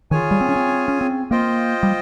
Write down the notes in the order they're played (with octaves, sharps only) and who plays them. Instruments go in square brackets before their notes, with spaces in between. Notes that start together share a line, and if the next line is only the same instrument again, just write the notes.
[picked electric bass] D#3 [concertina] F4 G#4 C#5 G#5
[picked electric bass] G3
C4
C#4
C4
C#4
C4
[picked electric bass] A#3 [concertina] F4 C5 D#5 G5
[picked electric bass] G3